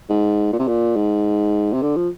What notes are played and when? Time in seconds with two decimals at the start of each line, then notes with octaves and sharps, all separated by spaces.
0.09 G#2
0.52 A#2
0.59 C3
0.68 A#2
0.96 G#2
1.73 C3
1.82 D3
1.96 F3